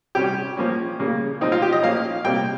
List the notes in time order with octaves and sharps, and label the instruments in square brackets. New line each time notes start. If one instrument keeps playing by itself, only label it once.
[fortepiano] C3 G3 C#4 G4
F3 A#3 C#4
C#3 G3 A#3 C#4
F3 C4 D#4
F4
G4
D#5
F3 A#3 C#4 F5
C3 G3 A#3 G5